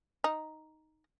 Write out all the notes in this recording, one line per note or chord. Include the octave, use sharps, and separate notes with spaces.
D#4